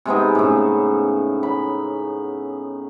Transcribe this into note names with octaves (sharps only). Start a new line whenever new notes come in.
C3 G#3 B3 D#4
A2 C#3
B5